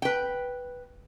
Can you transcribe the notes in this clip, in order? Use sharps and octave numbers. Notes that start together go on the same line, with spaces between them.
B4 G5